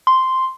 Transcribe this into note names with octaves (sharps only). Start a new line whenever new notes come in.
C6